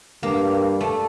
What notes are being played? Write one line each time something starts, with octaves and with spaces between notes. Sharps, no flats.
G2 A#3
A3